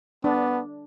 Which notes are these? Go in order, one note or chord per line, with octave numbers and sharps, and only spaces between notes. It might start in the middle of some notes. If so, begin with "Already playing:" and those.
B3 D4